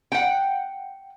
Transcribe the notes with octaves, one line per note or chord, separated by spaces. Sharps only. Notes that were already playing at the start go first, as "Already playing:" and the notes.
F#5 G5